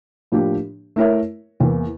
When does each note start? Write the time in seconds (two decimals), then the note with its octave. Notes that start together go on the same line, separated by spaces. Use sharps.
0.32 A2 F3 A#3 D4 G4
0.96 A3 E4 A#4 C#5 E5
1.60 E2 E3 A#3 E4